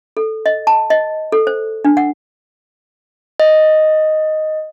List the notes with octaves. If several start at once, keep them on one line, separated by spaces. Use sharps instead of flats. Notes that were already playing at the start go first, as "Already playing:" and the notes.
A4
D#5
A5
D#5
A4
C5
D4
F#5
D#5